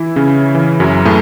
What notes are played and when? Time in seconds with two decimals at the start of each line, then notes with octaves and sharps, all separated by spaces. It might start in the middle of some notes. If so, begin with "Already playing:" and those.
Already playing: E3 E4
0.16 C#3 C#4
0.55 E3
0.80 F#2 F#3
1.05 A2 A3